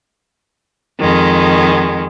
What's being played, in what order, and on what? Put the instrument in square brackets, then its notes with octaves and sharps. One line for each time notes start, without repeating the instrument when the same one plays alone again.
[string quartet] F2 D#3 G#3